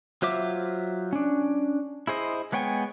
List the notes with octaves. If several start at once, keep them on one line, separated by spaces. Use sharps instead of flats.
F#3 F4 C5 E5 D6
C#4 D4
E4 G#4 C5 D#5
G#3 B3 C#5 G5 G#5